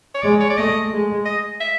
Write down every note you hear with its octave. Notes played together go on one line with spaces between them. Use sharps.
C#5
G#3 D5
C#5
D5
A3 D#5
G#3
D#5
E5